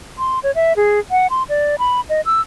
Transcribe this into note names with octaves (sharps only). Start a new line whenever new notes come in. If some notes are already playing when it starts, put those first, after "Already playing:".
C6
C#5
E5
G#4
F#5
C6
D5
B5
D#5
E6